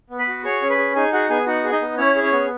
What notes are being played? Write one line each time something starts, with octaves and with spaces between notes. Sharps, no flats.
B3
B4 B5
F#4
G#4 C#5 C#6
C#4
B4 B5
G#4
D#4 G#4 G#5
F#4 G#4 F#5
B3 G#4 G#5
D#4 F#4 F#5
G#4
D#4 D#5
B3
C#4 E4 C#5
G#4
C#4 C#5
B3